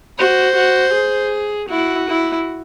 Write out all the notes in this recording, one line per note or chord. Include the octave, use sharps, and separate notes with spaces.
F#4 C5
F#4
G#4
E4 F#4
E4